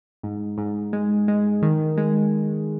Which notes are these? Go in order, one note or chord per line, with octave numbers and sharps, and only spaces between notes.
G#2
G#2
G#3
G#3
D#3
G#3